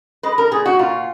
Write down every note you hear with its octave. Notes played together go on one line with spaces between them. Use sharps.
G#3 B4
A#4
A#2 G#4
F#4
A#2 F4